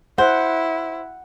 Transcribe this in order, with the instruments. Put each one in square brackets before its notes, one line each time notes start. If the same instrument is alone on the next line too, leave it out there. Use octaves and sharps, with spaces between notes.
[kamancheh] E4 [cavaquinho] C5 [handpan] F#5